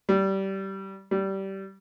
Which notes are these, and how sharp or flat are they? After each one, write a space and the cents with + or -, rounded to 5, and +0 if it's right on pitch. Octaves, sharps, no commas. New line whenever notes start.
G3 -20
G3 -20